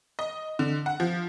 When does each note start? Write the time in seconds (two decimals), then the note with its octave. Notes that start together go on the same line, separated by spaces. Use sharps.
0.19 D#5
0.59 D3
0.86 F#5
1.00 F3